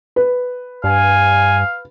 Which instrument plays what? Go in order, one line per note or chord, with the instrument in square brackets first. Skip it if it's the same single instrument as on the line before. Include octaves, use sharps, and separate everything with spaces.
[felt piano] B4
[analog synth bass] G2 [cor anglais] F5 [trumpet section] G#5